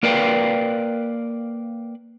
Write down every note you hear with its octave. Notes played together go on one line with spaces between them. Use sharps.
A#3 A#4 B4 D5 F5 G5